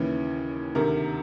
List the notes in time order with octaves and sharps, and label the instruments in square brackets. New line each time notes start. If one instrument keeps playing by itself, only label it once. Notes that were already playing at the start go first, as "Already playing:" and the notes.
Already playing: [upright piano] D#2 C#3 E3
D2 C3 D#3 A#4